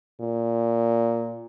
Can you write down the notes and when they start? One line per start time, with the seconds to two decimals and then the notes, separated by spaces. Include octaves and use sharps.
0.20 A#2